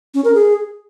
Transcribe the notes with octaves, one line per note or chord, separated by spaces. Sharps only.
C#4
A#4
G#4